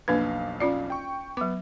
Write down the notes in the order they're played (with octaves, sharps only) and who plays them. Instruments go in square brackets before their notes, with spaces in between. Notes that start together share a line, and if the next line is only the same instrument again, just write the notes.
[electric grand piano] B1 F2 F5 [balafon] A#3 D4 B4
[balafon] C#4 F4 D5
[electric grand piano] G5 C#6
[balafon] F#3 D6 [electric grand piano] B3